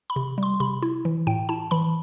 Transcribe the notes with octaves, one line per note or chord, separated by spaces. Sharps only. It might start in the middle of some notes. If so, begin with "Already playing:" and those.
B5
C3
G3 C6
C3 B5
E4
E3
A2 G5
E4 A5
E3 B5